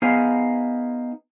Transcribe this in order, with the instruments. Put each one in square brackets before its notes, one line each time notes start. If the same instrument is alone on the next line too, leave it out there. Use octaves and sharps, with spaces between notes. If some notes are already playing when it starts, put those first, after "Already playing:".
[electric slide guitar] B3 D#4 G#4 C5 F5